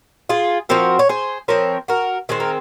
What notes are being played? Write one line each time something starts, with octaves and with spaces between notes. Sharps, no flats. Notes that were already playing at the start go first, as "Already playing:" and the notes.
F4 G#4
F3 C4 F#4 A#4
C#5
G#4 C5
F3 C4 A#4 C#5
F#4 A#4
D#3 G#3 C4 G#4
A#4